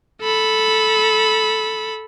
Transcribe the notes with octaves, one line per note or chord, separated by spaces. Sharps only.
A4 B5